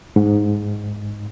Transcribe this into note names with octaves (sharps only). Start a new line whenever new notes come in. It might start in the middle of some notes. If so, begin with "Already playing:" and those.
G#2